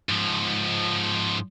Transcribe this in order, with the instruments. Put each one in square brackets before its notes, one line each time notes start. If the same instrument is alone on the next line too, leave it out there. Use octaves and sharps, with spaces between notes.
[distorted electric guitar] G#2 F3